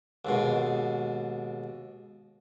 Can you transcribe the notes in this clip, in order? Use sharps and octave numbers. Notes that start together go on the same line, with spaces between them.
D#2 G#2 B2